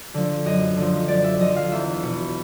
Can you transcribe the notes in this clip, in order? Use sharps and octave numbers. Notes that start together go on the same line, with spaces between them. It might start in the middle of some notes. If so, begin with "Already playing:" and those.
D3 F3
F#2 D#5
D3 F3
F#2 D5
E5
D3 F3 D#5
F5
E2 E5
B2